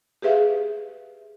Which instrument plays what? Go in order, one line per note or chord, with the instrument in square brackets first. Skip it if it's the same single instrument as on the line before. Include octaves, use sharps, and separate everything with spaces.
[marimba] G4 G#4 B4 E5 F5